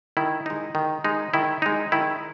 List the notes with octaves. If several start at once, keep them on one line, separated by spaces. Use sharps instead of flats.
D#3 E4
G#3 D#4
D#3
G#3 D#4
D#3 E4
G#3 D#4
D#3 E4